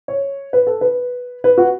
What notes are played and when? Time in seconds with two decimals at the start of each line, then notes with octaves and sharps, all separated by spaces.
0.08 C#5
0.53 B4
0.67 A4
0.81 B4
1.44 B4
1.58 F#4